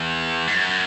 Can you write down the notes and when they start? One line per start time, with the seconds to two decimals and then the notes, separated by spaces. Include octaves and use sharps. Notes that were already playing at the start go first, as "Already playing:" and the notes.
Already playing: E2
0.47 G#2
0.54 F#2